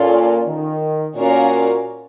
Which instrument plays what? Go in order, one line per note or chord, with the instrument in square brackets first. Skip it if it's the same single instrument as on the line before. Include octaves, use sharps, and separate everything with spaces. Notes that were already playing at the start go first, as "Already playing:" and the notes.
Already playing: [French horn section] A#2 [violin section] C#4 F4 A4 D5
[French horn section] D#3
[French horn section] A#2 [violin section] C#4 F#4 A#4 D5 F5